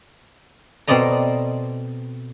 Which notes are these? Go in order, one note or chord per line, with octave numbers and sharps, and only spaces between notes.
B2 C4 A4 D5 D#5 A#5